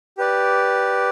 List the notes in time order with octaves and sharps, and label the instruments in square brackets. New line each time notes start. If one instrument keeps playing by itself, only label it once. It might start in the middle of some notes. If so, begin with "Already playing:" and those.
[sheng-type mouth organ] G4 B4 D5